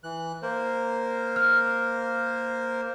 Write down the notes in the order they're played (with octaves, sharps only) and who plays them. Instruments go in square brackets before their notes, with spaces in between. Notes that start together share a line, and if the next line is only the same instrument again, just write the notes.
[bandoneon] E3 F#6
A#3 A#4 C5
[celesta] F6